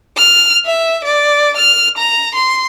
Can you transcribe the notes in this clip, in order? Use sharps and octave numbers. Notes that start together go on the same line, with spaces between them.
F6
E5
D5
F6
A#5
C6